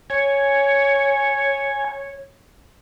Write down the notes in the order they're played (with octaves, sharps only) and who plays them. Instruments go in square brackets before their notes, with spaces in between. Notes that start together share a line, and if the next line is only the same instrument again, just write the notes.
[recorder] C#5 [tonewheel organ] G#5